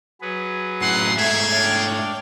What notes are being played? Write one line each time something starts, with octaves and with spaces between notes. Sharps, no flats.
F#3 G#4 B4
F#2 A2 F#5 C6
G#2 A3 G#4 C#5 E5
D4 C#5 D5 G5 F6